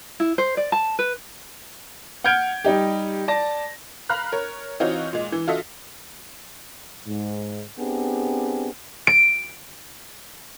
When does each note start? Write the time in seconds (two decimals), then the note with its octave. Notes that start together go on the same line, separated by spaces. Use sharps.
0.20 E4
0.38 C5
0.57 D5
0.72 A5
0.99 B4
2.24 F#5 F6 G6 G#6 D7
2.64 G3 D#4 G4
3.28 D5 A5 A#6
4.09 F5 A#5 B5 F6 F#6
4.32 A#4 C#5
4.80 E3 C4 D#4 F4 F#4 C#5
5.13 A#2 G#3
5.32 E3
5.48 F4 F#4 A4 D#5 E5
7.07 G#2
7.79 B3 C4 D4 G4 G#4
9.07 D7